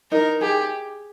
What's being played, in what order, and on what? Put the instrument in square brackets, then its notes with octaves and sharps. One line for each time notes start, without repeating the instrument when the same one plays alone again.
[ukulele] D#4 [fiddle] A#4
[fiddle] G4 [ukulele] G#4